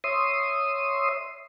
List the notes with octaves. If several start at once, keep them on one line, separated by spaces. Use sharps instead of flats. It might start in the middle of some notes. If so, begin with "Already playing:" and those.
C#5 E5 C6 D#6